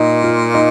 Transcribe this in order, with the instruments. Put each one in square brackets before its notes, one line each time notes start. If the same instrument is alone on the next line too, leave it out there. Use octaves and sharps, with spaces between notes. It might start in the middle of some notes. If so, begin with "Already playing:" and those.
Already playing: [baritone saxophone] A#2 [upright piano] D#4
[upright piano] F4
D#4